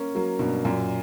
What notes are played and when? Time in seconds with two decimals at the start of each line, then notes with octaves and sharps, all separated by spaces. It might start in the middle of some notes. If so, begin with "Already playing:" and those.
Already playing: A#3 C#4
0.15 F#3 A#3
0.39 G2 B2
0.65 F#2 A#2